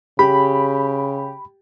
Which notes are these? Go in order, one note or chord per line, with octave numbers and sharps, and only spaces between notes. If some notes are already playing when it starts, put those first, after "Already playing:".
C#3 G4 B5